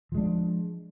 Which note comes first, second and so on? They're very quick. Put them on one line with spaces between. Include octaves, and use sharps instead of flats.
F3 G#3 D4